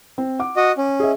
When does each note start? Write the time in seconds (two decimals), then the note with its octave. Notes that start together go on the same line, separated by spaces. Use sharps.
0.18 C4
0.39 F#5 D6
0.56 F#4 D#5
0.77 C#4
1.00 G#4 D#5 E5